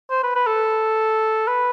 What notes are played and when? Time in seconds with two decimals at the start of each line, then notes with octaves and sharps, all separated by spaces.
0.10 C5
0.23 B4
0.35 B4
0.47 A4
1.48 B4